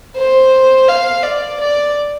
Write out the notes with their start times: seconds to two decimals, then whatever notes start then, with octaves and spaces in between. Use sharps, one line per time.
0.16 C5
0.88 F5
1.23 D5
1.60 D5